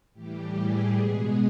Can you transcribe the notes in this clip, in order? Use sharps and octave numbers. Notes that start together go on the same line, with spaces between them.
A2 E3 G3 G4
G#4
B2 G#3 B3 G#4